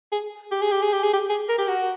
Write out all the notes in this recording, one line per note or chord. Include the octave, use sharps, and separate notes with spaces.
G#4
G4
G#4
G4
G#4
G4
G#4
G4
G#4
A#4
G4
F#4